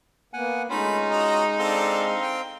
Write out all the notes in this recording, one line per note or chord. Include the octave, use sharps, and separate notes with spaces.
A#3 B3 F#5 G#5
G#3 A3 C#4 D#4 F4 B5
F#4 D#5 A#5
C4 D4 A4 D5 F5 C6
G5